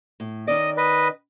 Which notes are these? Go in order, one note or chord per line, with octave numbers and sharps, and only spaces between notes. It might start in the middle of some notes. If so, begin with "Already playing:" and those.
A2
D#3 C#4 D5 D#5
B4 D#5